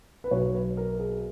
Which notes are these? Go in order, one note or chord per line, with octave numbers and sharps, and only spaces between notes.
B4
B1 B2 C#5
B4
A#4
G#4